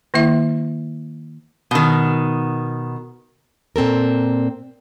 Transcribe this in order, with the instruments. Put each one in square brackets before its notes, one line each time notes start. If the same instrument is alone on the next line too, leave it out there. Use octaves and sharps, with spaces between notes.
[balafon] D#3 A#3 E4 E5
[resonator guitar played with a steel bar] B2 D#3
[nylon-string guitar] A#2 C4 A4 A#4